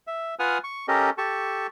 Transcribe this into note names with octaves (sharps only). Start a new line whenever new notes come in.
E5
F4 B4 F#5 G#5 D#6 F6
C#6
C#4 G4 A4 A#4 D#5
G4 A4 A5 C#6